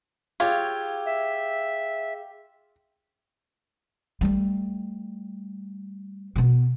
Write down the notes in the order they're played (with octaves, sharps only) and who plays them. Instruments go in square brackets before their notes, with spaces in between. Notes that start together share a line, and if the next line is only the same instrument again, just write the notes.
[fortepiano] F4 [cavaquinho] G4 C#5 [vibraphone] G#4 F5 E6
[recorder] E5
[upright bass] G3 A3
B2 B3